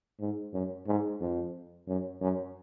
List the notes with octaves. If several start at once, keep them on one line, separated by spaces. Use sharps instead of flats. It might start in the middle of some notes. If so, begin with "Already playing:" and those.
G#2
F#2
G#2
F2
F#2
F#2